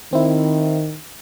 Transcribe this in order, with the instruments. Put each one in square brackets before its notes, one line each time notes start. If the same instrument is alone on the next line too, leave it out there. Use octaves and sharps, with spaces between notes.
[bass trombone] D#3 [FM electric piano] C4 E4